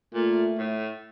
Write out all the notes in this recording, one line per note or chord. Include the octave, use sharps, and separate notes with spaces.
A#2 A3
A2